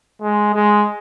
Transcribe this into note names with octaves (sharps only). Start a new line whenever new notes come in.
G#3
G#3